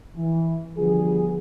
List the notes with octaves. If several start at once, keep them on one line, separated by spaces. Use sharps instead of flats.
E3
D3 F3 G3 B3 G#4